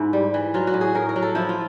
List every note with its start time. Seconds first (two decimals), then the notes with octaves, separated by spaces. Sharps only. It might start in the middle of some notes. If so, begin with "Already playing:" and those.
Already playing: G#2 E4
0.13 G3
0.34 E3
0.54 F#3 F4
0.67 F#4
0.74 A2
0.81 G#4
0.95 A2 A#4
1.09 A#4
1.16 F#3
1.22 A4
1.35 F3 E4
1.49 F4